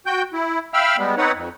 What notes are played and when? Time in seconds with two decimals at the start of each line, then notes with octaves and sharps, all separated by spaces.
0.06 F#4 G5 G6
0.33 E4
0.74 E5 F5 G5 B5 E6 F6
0.98 G3 G#3 B3
1.17 C4 D#4 B4 C#5 F#5
1.34 F2